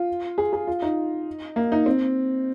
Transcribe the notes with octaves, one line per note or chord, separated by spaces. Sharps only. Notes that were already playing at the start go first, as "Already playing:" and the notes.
Already playing: F4
G#4
G#4
F4
D#4
A#3
D#4
C4